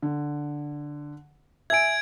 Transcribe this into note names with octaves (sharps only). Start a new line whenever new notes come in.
D3
E5 G#5 G#6 D7